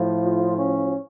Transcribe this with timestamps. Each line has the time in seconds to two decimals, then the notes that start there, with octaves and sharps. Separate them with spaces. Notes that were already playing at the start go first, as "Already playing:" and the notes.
Already playing: A2 F3
0.23 F4
0.58 C#4